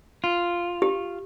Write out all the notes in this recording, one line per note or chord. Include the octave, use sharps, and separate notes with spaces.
F4
G4